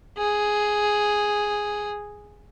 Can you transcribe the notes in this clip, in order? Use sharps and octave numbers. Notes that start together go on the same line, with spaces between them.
G#4